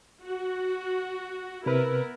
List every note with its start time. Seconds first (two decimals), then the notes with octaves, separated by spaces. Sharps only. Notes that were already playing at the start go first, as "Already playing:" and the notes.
0.24 F#4
1.66 C3 B3 E4 A#4 B4